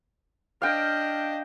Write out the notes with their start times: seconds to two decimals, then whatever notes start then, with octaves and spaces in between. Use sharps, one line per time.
0.62 D4 D#5 F5 G5